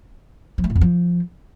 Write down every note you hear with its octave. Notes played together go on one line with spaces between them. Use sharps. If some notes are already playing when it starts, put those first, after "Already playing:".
F3
A3
A2
F2
F3